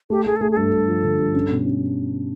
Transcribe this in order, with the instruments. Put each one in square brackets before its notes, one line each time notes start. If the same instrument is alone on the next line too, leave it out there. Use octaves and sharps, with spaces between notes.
[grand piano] A3 [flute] G4
[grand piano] A3 [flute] G#4
[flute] A4
[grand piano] A3 [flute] G#4
[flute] G#4
[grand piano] G2 [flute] A4
[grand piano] G2
F3
D3
G2
C#4
B2
C#4